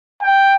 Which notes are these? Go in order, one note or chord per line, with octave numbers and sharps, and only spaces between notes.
G5